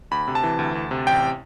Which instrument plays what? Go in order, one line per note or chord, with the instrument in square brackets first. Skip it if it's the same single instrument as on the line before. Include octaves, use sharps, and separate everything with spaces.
[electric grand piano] D2 B5
C3
A5
E3
D2
D2
C3
A1 G5